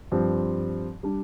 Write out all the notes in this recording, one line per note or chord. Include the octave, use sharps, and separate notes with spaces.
G2 F3 C4
G3 D4